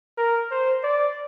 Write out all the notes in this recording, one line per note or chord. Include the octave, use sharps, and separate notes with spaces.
A#4
C5
D5